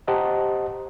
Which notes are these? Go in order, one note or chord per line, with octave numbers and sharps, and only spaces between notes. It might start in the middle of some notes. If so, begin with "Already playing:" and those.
G4 C5 D#5 F#5 A5 A#5